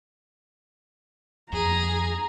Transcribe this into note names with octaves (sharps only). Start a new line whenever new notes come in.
F2 G#4 A#5